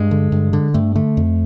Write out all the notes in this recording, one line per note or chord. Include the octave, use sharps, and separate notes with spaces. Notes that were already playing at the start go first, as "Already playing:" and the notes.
Already playing: G2 G#3
D3
G2
D3
G2 A3
D3 A3
F2